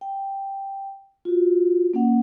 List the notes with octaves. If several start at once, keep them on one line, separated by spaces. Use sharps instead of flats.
G5
F4 F#4
A#3 C#4 F#5